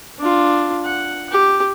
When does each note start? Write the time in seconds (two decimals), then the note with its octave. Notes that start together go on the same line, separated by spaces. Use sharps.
0.20 D4 F4
0.85 F#5
1.32 G4